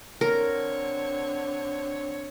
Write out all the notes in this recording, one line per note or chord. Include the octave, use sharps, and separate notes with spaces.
D3 C4 A#4 C#5